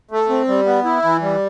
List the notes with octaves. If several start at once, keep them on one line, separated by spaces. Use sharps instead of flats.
A3
C4
G3
B3
E4
E3
G3